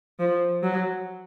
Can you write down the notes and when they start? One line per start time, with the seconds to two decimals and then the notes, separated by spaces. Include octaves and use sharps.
0.19 F3
0.63 F#3